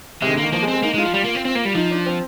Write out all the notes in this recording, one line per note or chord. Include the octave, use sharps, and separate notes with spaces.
C3 G#3
D#3
D3
A#3
D#3
F3 A#3
G#3
C4
G#3
A#3 D#4
G#3
F4
F3
G3
A#3
C4
C4
A#3
G3
F3 D#4
D4
C4